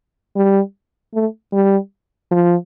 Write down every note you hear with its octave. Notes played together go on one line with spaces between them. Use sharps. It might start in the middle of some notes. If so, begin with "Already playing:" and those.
G3
A3
G3
F3